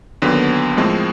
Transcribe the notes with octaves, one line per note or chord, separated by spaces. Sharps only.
D#2 D3 F#3 B3
A2 F3 G#3 C4